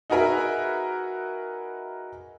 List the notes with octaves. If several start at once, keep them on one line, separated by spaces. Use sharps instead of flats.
D#4 F#4 G#4 A#4 B4 E5